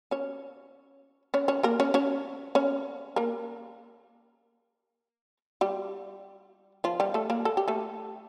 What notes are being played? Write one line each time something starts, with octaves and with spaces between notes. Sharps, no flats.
C#4 C#5
C#4 C#5
C#4 C#5
A#3 A#4
C#4 C#5
C#4 C#5
C#4 C#5
A#3 A#4
G3 G4
F3 F4
G3 G4
A3 A4
A#3 A#4
A4
G4
A3 A4